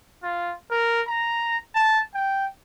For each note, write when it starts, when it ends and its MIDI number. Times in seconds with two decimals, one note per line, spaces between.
0.23 0.53 65
0.71 1.01 70
1.07 1.57 82
1.75 1.99 81
2.14 2.46 79